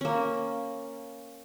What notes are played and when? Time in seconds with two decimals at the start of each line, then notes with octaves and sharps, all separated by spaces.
0.01 A#3 C#4